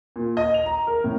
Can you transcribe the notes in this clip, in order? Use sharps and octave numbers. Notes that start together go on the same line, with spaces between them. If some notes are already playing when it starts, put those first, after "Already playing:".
A#2
D#5
F7
A#5
A#4
A2